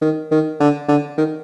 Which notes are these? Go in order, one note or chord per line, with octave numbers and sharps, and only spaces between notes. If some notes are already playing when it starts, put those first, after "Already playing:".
D#3
D#3
D3
D3
D#3